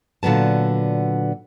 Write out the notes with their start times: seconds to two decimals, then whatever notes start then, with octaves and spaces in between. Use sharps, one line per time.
0.23 A#2 D3 F#3 B3 A5